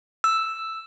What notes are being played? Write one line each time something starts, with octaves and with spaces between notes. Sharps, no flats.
E6